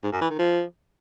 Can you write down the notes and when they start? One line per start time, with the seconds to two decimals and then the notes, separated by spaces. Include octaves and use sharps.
0.04 G#2
0.12 F#2
0.21 E3
0.30 D#3
0.39 F3